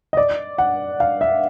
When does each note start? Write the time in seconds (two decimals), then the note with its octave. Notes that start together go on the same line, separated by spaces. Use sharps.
0.13 D#5
0.17 D5
0.58 F#5
1.00 F5
1.21 E5